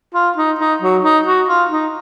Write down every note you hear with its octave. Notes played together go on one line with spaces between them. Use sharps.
F4
D#4
D#4
F#3
D#4
F#4
F4
D#4